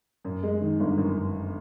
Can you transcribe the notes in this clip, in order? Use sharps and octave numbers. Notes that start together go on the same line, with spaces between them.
F#2
G#3
D#3
G1
F#2